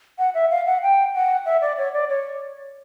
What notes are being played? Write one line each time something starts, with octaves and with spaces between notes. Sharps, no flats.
F#5
E5
F5
F#5
G5
F#5
E5
D5
C#5
D5
C#5